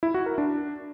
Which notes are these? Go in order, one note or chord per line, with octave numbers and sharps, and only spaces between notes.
E4
F#4
A#4
D4